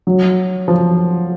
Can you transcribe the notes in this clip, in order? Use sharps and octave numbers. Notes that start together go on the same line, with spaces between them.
F#3
F3